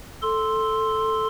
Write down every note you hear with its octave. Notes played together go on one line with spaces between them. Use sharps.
A4 C6